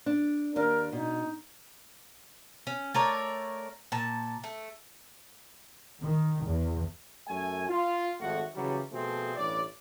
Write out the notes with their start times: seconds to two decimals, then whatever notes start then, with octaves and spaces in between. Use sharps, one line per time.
0.06 D4
0.56 D#2 D4 A#4
0.92 B2 D#4
2.67 C#4
2.94 A3 A#4 C#5 D5
3.92 A#2 A5
4.44 A3
6.02 D#3
6.45 E2
7.27 F#2 A3 G#5
7.68 F4
8.20 G#1 F2 A3 F#4 F#5
8.54 C#3 E3 F#3 G3
8.92 B2 F3 A3 C4 G#4
9.35 A1 G2 C#5 D5